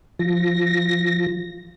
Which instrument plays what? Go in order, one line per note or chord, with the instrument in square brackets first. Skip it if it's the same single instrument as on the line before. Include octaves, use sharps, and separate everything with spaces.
[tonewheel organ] F3 A#6